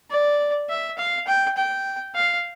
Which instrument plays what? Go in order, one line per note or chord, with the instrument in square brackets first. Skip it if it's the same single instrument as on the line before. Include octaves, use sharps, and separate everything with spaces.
[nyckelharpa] D5
E5
F5
G5
G5
F5